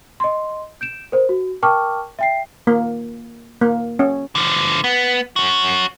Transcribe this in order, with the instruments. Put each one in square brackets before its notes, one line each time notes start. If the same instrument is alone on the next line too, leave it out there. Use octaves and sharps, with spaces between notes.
[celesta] D#5 C6
G6 D7 E7
A#4 C5
F#4
A#4 G5 A5 C#6 D6 F6
E5 G5 C7
[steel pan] A#3
A#3
C#4
[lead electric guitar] D3 F3
B3
C#4 F#4